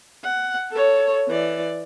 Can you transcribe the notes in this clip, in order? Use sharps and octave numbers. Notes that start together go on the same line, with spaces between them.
F#5
A4 C#5
E3 D5